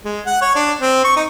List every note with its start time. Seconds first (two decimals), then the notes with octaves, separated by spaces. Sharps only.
0.05 G#3
0.26 F#5
0.42 C#5
0.56 D4
0.81 C4
1.04 C#6
1.16 D#4